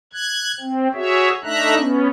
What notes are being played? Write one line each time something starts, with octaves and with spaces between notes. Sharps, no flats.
F#6 G#6
C4
F#4 G#4 C#5 E5
A3 D4 D#4 E5 A#5 F#6
B3 C#4